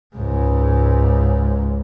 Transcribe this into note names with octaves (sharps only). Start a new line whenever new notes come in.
C#2 G#2